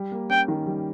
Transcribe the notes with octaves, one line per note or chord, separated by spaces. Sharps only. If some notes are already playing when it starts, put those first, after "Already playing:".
Already playing: G3
A#3
C#4 G5
D#3
G3